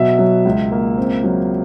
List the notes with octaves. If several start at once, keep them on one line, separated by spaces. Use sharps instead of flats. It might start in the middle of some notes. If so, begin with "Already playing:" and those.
Already playing: B2 F#3 E5
F#3
C#2
A#3
C4
F#3